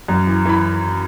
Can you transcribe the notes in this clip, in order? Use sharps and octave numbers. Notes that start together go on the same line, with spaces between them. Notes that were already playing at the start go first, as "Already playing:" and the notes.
F#2
E3
E3 B5